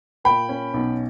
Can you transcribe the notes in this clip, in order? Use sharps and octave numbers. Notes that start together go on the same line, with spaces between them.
A#2 G5 B5
C#4
B1